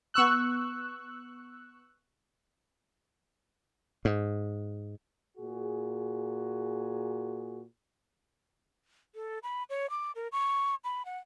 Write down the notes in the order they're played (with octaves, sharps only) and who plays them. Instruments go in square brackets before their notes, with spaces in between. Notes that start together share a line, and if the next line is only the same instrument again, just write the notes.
[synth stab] B3 C#6 E6 F#6
[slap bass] G#2
[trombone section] A#2 F#4 G#4
[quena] A4
B5
C#5
D6
A#4
C#6
B5
F#5